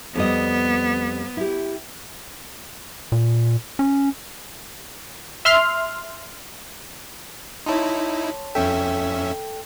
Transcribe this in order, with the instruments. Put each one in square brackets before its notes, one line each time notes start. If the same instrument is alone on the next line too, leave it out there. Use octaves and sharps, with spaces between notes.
[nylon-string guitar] F2 G3 D#5 [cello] B3
[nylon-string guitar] E4 G4
[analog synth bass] A#2
C#4
[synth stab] E5 C6 F6
[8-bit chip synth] D#4 E4 [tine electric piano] C#5 A5 C6
[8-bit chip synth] F2 C#4 E5 [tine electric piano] A4 G5